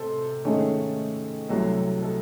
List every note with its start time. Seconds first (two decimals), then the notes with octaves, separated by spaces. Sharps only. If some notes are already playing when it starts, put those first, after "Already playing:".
Already playing: C3 C4 A4 C5 C6
0.45 G#2 D#3 A3 C#4 G#4
1.49 C2 C3 F#3 A3 A4
2.02 A4